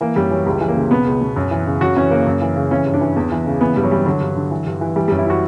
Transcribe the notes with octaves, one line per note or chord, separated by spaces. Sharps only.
E3 A#3
F#2 G3
E3 F#3
C#2 G3
E3
A#3
C#3
B2 B3
C#2
B2
F#2
E3
C#3
F#2 F#4
E3 C#4
C#3 A#3
F#2
E3
C#3
E3 C#4
G2
D4
E3
E2
E3
C#3
E3 B3
G2 G3
F#3
E3 G3
D3 F#3
G2
D3
E3
G2
E3
E3 G3
F#2 G3
E4
E3 F#4